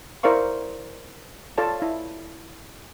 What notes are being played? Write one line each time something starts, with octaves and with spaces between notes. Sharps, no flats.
E4 A#4 C5 D5 F5 C#6
F4 A4 C#5 D5 A5
E4 F5